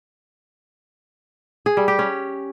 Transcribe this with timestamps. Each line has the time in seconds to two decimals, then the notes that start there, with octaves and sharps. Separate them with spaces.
1.66 G#4
1.77 G3
1.88 G4
1.99 C#4